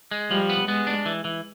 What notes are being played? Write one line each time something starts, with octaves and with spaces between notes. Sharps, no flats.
G#3
F3 G3
B3
G#3 B3
D4
E3
E3